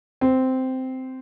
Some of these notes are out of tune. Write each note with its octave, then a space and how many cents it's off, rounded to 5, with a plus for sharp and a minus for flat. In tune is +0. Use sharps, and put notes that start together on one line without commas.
C4 -10